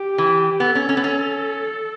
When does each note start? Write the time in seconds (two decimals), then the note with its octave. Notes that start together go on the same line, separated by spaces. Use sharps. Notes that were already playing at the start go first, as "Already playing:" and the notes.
Already playing: G4
0.18 E3
0.60 B3 A4
0.75 C#4
0.89 C#4
0.97 B3
1.04 C#4